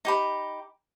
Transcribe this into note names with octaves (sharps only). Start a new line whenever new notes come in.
D#4 G4 B5